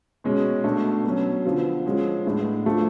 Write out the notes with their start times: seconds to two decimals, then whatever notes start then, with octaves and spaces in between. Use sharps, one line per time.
0.24 B2 G#3 C#4
0.64 B2 A3 D4
1.04 B2 F#3 C#4
1.45 D3 F3 B3
1.86 F3 G#3 C#4
2.25 A2 G#3 B3 D4
2.66 F3 A3 D4